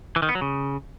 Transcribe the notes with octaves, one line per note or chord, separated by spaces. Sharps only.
E3
D#3
B3
F#3
C#3